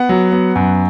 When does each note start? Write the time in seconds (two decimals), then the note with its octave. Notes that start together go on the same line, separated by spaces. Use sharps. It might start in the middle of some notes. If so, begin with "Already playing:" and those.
Already playing: B3 F#5
0.09 F#3
0.32 B3
0.55 F#2